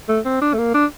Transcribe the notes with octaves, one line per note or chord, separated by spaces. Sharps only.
A3
C4
D4
A3
A#3
D4